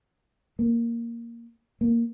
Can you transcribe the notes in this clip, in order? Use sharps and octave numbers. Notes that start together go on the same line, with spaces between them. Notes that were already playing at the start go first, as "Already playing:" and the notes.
A#3
A#3